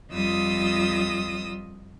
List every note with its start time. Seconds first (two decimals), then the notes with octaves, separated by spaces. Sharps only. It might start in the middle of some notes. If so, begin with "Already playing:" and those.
0.11 F2 G3 F4 D#5 D#6 E6